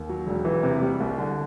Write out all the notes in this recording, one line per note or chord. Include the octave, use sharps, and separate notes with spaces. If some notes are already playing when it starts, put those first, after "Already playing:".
Already playing: D#2
F#3
E1
E3
C3
G3
C2
D3